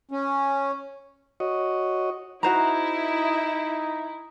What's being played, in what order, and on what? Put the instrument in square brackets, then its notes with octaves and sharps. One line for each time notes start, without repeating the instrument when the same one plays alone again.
[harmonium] C#4
[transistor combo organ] F#4 C#5 D#5
[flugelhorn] D#4 [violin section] E4 [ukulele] F#4 C5 A#5